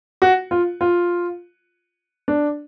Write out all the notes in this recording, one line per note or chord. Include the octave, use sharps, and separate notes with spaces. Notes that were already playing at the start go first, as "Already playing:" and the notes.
F#4
F4
F4
D4